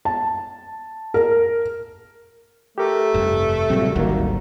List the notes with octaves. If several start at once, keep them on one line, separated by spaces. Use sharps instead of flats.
A5
A#4
A3 G4 A#4
F1 G2
A#2 C#3 F#3 G3 C4
G#1 D2 D#3 A#3 F#4